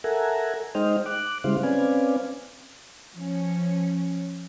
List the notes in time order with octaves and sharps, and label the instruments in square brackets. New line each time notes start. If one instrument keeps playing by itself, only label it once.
[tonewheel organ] A4 A#4 E5 F#5 G#5 A#5
G#3 D#4 C5 D#5 G5 F6
D6 F#6
C#3 G3 G#3 E4 C5 F5
C4 C#4 B4 D5 F5 G#5
[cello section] F3 C#4